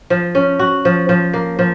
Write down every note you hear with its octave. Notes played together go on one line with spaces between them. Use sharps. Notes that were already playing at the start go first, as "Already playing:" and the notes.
F3
C#4
F#4
F3
F3
A#3
F3